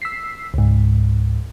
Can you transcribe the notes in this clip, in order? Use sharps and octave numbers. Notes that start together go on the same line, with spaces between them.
E6 B6 C7
C#2 G#2